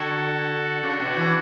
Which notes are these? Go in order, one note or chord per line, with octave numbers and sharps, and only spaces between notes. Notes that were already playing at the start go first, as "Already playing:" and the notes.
Already playing: D3 F#4 A4
C#3 D4 F#4
B2
E3